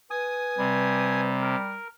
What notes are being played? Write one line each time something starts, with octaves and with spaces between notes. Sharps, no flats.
B4 G#5 D#6
C3 G3
A#4